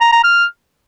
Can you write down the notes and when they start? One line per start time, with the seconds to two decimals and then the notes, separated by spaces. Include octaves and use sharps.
0.01 A#5
0.12 A#5
0.24 F6